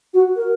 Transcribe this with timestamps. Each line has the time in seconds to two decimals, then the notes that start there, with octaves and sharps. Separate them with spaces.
0.14 F#4
0.36 A#4